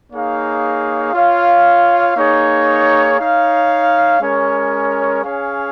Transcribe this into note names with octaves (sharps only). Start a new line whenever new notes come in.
A#3 D#4 G#4 C#5 F5
F4 C#5 F5
A#3 D#4 G#4 C#5
D#4 C#5 F5
G#3 C#4 A#4 C#5
C#4 G#4 C#5 F5